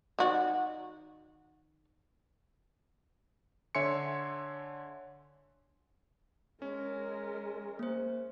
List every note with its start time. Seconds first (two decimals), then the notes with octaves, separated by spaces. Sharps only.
0.19 D#3 F#4 D5
3.75 D3 C#5 E5 G#5 C6 C#7
6.62 G#3 C#4 A#4
7.79 A#3 C5